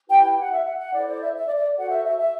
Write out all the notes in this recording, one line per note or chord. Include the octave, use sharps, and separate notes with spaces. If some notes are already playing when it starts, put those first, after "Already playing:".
E4 G4 B4 G5
G5
F#5
E5
F#5
F#5
E4 A4 C5 D5
D5
E5
E5
D5
D5
F#4 A4 C5 F#5
E5
E5
E5